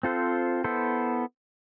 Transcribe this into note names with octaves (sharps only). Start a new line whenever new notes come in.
C4 F4 A4 C5
B3 E4 A4 C5